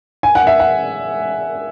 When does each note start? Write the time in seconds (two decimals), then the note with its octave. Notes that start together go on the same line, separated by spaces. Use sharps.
0.23 G#5
0.35 F#5
0.47 E5
0.60 F#5